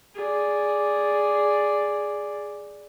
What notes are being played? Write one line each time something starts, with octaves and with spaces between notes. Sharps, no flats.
G#4 D5